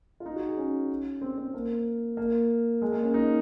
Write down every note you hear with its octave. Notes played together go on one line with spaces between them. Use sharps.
F4
D#4
F#4
G#4
C#4
C4
C4
A#3
A#3
G#3
A#3
C#4
D#4